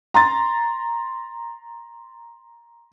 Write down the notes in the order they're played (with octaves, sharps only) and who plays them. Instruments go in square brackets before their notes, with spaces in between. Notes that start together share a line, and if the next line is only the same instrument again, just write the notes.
[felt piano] A#5 C6 A6